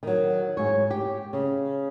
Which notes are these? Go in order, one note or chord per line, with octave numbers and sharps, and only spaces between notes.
D#3 F#3
G#2 C#5
G4
C#3